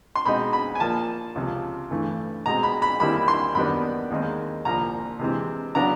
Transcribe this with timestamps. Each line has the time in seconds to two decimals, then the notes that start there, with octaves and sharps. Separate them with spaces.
0.15 C6
0.25 B2 G#3 C4 D#4 B5
0.53 B5
0.75 G#5
0.80 A#2 F3 A#3 A5
1.35 C#2 C3 F3
1.91 G2 E3 A3
2.46 B2 G#3 C4 A#5
2.63 B5
2.82 B5
3.00 D#2 D#3 G3 C4 E4 B5
3.28 C6
3.55 F#2 D#3 G3 B3 D4 B5
4.11 D#2 D#3 G#3 C4 D#4
4.65 C2 A#2 F3 A#5
5.19 C3 E3 G#3 C4
5.75 C#3 F#3 B3 D4 A#5